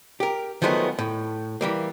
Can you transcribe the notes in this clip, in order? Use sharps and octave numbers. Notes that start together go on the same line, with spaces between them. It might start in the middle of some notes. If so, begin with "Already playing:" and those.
G4 A#4
D#3 F3 F#3 G#3 A3 B3
A2
E3 G3 A#3